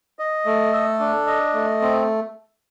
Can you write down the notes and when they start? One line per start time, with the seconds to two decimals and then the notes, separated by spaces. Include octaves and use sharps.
0.19 D#5
0.46 A3
0.73 A4
1.00 D4
1.27 D#5
1.54 A3
1.82 C4